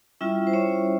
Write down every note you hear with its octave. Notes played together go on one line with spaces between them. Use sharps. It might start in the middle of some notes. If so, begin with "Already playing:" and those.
G3 C#4 E4 F4 E5
C5
C#4 C#5